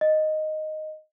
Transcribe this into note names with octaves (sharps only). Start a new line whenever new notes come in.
D#5